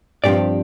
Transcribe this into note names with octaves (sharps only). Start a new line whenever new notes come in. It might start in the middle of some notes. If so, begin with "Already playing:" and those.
G2 F3 C4 G4 D5